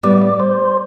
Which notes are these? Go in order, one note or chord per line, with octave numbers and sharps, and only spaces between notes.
A2 G3 B3 D5
D5
C5